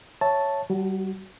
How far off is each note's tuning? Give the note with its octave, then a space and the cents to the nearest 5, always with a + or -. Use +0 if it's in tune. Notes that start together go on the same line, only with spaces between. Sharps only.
C#5 +0 E5 +0 A5 +0
G3 -30 F#4 +10